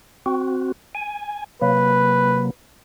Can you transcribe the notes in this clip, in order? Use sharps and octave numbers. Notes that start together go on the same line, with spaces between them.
C4 F#4
G#5
C3 F#3 A#3 B4